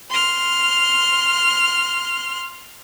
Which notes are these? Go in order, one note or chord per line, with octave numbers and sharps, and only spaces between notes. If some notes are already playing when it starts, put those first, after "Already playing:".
C6 F6